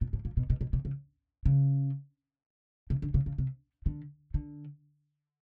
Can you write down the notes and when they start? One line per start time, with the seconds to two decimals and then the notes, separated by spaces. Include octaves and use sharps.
0.01 A#2
0.13 A2
0.25 A#2
0.37 B2
0.50 B2
0.61 B2
0.73 C3
0.85 C#3
1.46 C#3
2.90 C3
3.02 D3
3.14 C#3
3.26 C#3
3.38 C3
3.86 D3
4.34 D3